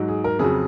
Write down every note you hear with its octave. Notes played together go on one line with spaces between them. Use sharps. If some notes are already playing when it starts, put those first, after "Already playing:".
Already playing: G#2 F#3
G#4
A#4
F2 C#3 F#3 G#4